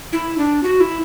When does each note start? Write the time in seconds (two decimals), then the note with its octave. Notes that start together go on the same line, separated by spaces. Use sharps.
0.13 E4
0.38 D4
0.63 F#4
0.80 E4